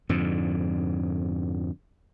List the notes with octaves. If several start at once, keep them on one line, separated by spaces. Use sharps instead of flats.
F2 G#2 D3